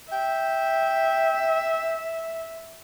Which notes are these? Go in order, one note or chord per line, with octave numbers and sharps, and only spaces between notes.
E5 G5